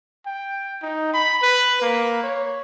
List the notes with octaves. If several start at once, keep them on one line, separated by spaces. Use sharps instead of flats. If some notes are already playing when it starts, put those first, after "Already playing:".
G5
D#4
B5
B4
A#3
C#5